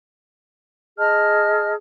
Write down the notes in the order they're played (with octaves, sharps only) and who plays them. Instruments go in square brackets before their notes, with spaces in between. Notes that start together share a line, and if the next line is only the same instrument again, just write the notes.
[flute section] G#4 D#5 A5 F6